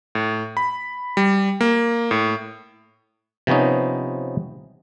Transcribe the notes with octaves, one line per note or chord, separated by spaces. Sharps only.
A2
B5
G3
A#3
A2
C3 F3 B3 C#4 D#4